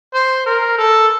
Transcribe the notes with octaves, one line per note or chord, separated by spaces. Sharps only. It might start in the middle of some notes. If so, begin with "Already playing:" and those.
C5
A#4
A4